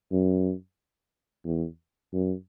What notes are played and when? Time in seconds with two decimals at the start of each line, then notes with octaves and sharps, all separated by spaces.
0.12 F#2
1.45 E2
2.13 F#2